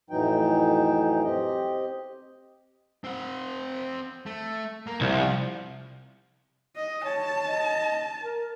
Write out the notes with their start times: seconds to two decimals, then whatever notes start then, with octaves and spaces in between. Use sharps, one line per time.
0.10 F2 A2 E3 F#3 D#4 G5
1.24 C4 G4 D#5
3.04 C4 F#5
4.26 A3
4.87 A#3
5.01 C2 F3
6.76 D#5
7.05 C#5 A5
7.48 D#5
8.24 A#4